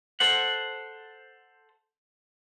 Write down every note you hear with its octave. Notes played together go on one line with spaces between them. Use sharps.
A4 C5 F#5